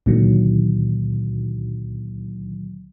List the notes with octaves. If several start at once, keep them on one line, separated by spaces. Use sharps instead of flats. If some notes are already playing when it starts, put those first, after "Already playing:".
C#2 A#2 D3 D#3 F#3